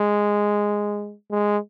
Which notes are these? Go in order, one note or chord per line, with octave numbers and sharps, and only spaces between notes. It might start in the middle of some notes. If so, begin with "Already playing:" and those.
Already playing: G#3
G#3